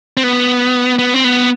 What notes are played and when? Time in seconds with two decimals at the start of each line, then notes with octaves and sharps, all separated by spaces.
0.17 C4
0.24 B3
0.99 B3
1.14 C4
1.24 B3